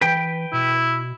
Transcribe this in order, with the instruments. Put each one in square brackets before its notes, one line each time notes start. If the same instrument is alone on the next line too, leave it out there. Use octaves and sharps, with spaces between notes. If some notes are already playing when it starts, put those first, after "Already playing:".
[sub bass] E3 [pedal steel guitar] B4 G5
[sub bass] B2 [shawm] E4